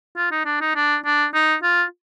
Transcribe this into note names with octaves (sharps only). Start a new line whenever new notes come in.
F4
D#4
D4
D#4
D4
D4
D#4
F4